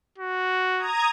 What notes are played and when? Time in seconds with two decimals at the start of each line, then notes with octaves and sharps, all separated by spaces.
0.18 F#4
0.79 A#5 D#6 G#6